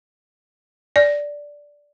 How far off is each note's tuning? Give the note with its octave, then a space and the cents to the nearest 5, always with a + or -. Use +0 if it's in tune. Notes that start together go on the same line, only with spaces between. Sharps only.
D5 -5